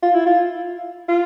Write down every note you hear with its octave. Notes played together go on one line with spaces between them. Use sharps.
F4
E4
F4
F4